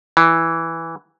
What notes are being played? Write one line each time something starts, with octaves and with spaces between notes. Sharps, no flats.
E3